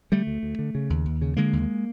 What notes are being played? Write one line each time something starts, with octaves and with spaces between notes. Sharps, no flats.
D3 G3 A3
D2
D2
D3
C#3
D#2
D#2
C#3
D3 G#3 A#3
D#2